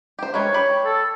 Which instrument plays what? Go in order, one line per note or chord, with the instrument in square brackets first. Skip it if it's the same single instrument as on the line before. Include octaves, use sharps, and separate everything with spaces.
[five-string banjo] G4 C5
[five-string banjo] G#3 A#4 B4 [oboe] C#5
[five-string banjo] G4 B5
[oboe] A4